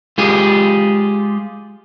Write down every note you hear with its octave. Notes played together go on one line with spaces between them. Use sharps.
G#3 F4 G4 G#4